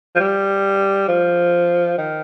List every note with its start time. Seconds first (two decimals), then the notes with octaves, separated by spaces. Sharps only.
0.15 F3
0.19 G3
1.08 F3
1.98 D#3